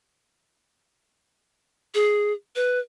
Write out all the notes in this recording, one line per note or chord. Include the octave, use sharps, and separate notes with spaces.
G#4
B4